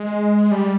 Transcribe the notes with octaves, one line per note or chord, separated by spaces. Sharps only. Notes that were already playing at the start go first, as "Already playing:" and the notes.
Already playing: G#3
G3